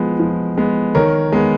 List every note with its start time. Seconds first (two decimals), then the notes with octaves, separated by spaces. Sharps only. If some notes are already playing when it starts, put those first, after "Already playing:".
Already playing: F3 G#3 B3
0.19 F3
0.58 G#3 B3
0.95 D#3 A#4 C#5
1.32 G#3 B3